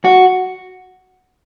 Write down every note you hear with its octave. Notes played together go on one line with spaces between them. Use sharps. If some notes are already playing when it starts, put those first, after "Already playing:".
F#4